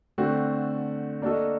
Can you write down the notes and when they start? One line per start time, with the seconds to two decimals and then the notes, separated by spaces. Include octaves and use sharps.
0.18 D3 A3 C4 F#4
1.22 A#3 D4 F#4 A4 D#5